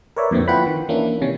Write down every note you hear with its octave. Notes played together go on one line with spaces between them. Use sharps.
A#4 B4 C#5 D5 E5
F2 A#2 D3 B3 C4
E4 F4 B4 F#5 G5 B5
D#3
E3 A#3 C#4 D4 E4
C3 D#3 C#4